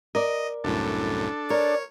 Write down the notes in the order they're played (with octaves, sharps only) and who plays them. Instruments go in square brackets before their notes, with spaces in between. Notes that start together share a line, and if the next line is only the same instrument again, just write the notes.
[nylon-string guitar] A#4 D5 [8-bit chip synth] D#5
[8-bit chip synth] C2 F#2 A2 [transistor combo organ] D4 A4
[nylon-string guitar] A#4 [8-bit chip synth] C#5 [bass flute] D5